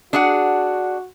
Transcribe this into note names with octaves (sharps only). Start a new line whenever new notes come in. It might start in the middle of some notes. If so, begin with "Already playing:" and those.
D4 F#4 G#4 F#5